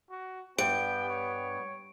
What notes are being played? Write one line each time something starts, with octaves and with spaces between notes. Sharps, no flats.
F#4
G2 B3 G5 D7
C#5